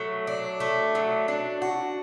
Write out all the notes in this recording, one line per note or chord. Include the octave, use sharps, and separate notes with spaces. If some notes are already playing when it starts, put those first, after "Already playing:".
Already playing: F#3 A3
D4
A3
F#3
D4
F#4